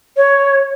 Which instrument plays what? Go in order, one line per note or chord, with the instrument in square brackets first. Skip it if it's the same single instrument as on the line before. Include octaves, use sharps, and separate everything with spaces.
[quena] C#5